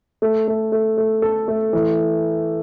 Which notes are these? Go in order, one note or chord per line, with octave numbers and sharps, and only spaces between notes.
A3
A3
A3
A3
A4
A3
E3